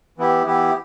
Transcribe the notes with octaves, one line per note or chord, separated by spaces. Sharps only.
E3 B3 E4 G4
E3 B3 E4 G4